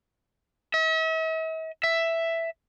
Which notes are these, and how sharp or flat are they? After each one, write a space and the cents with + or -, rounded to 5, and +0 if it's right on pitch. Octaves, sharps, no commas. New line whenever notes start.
E5 -45
E5 +5